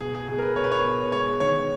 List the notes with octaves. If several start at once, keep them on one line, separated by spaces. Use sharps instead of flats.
B2 G#4
G#4
B2 G#4
A#4
B4
B2 C#5
B4
C#5
B2
G#3 C#5
D#3 C#5